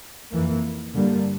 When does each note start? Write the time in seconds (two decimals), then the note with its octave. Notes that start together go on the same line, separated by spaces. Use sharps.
0.31 F2 E3 A#3
0.93 G2 D3 G3 A#3